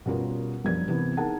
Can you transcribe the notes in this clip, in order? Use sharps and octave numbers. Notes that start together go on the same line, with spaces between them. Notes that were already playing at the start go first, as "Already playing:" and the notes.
B2 G3 C#4 F4 A#4
A#1 F#2 F3 G3 A#4 G#6
C3 E3 B3 E4
D#4 G#4 A#4 F#5 A5